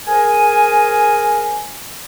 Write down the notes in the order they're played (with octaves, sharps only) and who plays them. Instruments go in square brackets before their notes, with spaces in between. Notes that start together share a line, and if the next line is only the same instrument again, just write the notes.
[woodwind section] G#4 A#4 C5 G#5